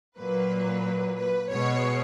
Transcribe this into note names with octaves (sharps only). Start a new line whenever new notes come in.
A#2 F#3 A#3 B4
B4
B2 G#3 B3 C#5